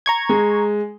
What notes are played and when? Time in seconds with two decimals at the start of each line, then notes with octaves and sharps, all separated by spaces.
0.06 A#5 C#6 G#6
0.29 G#3